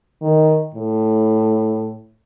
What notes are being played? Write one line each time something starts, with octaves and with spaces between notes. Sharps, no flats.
D#3
A2